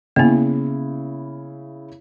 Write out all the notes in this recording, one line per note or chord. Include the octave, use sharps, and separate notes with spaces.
C#3 A#3 B3 E4